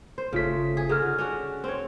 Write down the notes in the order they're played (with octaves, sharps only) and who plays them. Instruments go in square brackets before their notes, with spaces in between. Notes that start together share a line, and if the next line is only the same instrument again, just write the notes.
[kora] C5
[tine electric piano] G1 F4 B6 [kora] C#3 A3
[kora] G#4
[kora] D3 D#4 F#4 [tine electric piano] G#4 F6
[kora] C#4 D4 F#4
C4 C#5